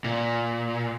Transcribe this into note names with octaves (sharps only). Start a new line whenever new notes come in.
A#2